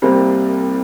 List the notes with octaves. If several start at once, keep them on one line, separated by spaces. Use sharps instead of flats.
C2 C3 G3 A#3 C5